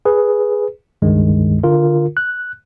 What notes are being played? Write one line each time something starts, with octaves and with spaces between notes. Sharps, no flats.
G#4 B4
C#2 G2 D#3 G#3
D3 F4 A#4
F#6